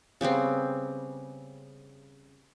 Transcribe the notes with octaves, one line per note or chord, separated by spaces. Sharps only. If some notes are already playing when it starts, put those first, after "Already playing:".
C#3 G3 B3 C4